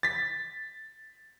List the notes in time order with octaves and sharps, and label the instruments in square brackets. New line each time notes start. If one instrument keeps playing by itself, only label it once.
[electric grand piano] A6 B6